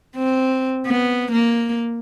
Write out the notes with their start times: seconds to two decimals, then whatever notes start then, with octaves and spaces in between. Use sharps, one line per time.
0.16 C4
0.86 B3
1.32 A#3